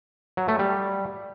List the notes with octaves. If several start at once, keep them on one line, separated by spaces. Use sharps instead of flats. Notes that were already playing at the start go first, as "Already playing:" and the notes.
F#3
A3
G3